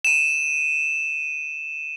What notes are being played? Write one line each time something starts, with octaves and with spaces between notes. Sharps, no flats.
D#7 E7